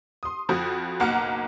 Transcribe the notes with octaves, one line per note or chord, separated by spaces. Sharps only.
C6 D#6
F2 F3 F#4 D#6
F#1 B1 A#3 F#5 A#5 F6